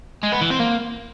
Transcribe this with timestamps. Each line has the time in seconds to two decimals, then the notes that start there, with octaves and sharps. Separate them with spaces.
0.23 G#3
0.32 B3
0.41 E3
0.50 C4
0.60 A#3